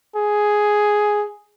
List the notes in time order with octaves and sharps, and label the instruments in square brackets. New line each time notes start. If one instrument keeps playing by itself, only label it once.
[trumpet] G#4